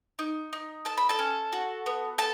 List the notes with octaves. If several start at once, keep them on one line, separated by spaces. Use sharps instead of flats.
D#4
D#4
A4 A5
B5
A4 A5
C#4
F#4
B3
A4 A5